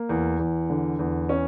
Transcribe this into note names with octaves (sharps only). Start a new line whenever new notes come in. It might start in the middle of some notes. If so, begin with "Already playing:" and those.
Already playing: A#3
E2
E2
D3
E2
C#4